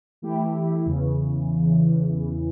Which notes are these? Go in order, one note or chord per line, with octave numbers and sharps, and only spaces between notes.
E3 A3 E4 G4
E2 C#3 E3